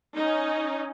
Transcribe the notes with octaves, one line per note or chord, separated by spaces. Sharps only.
C#4 D#4